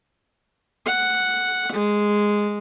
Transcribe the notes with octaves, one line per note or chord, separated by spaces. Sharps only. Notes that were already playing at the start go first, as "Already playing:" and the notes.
F#5
G#3